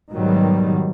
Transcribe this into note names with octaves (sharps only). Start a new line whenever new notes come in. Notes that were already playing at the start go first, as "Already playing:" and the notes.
G#2 B2 D#3 F#3 G3